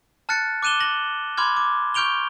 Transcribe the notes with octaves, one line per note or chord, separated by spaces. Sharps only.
A5 F6 F#6 A6 C#7
D6 F#6 D#7 E7 G7
A#6 F#7
B5 C6 D6 F6 G#6
D6
C#6 F6 G6 D7 F7 G7